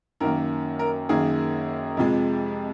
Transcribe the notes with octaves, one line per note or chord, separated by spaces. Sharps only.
F#2 D#3 A#3 A#4
A#4
F#2 D#3 A#3 G#4
F2 C3 F3 G#3